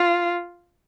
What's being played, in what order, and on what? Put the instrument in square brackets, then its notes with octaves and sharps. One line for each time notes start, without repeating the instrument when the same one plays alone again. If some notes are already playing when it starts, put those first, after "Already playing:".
Already playing: [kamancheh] F4